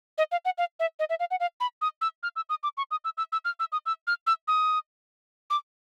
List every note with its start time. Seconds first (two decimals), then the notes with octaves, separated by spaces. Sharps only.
0.18 D#5
0.32 F5
0.45 F#5
0.58 F5
0.80 E5
0.99 D#5
1.10 E5
1.20 F5
1.31 F#5
1.40 F5
1.60 B5
1.81 D#6
2.01 E6
2.23 F6
2.36 E6
2.49 D#6
2.63 D6
2.77 C#6
2.91 D#6
3.04 E6
3.17 E6
3.32 E6
3.45 F6
3.60 E6
3.72 D#6
3.86 E6
4.07 F6
4.27 E6
4.48 D#6
5.50 D6